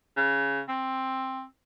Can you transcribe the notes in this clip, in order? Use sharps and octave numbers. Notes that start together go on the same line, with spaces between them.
C#3
C4